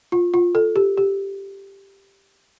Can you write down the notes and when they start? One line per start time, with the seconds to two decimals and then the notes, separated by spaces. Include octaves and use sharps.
0.12 F4
0.34 F4
0.55 A4
0.76 G4
0.98 G4